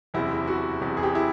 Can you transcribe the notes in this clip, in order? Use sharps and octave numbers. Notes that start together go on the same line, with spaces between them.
F#1 E2 C3 E4
F#4
F#1 E2 C3
G#4
G4
E4